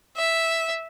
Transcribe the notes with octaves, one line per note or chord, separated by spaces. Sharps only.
E5